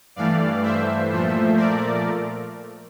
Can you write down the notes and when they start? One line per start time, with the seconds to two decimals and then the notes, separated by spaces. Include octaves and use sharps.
0.16 G2 E3 A3 D5 F5
0.63 C5 E5
1.10 A#2 F3 A3
1.57 A#4 D5